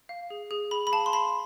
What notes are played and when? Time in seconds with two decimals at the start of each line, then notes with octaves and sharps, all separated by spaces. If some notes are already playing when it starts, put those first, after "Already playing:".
0.09 F5
0.30 G#4
0.51 G#4
0.71 G#4 B5
0.87 B5
0.92 F5 A5
1.06 C6
1.13 F5 B5